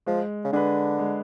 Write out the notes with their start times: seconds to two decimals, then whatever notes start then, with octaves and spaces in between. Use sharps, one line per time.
0.06 F3 G#3
0.44 C#3
0.53 D3 D4 G#4 B4
0.99 G#3